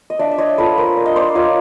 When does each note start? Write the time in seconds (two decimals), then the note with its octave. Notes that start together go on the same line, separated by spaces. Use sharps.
0.10 D#5
0.19 D4 D5 E5
0.32 E5
0.38 C#5 D#5
0.58 F4 A4 B4
0.78 A#4 C5
0.97 D4
1.06 D#5
1.16 C5 D5
1.35 F4 C#5 D#5